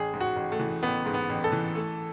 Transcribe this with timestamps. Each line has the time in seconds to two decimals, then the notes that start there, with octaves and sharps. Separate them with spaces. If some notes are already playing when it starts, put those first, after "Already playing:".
Already playing: A1 G#4
0.14 G#2
0.21 F#4
0.36 A1
0.52 A3
0.59 E3
0.83 A1 B3
1.06 G#2
1.14 B3
1.30 A1
1.44 A4
1.52 E3
1.75 A3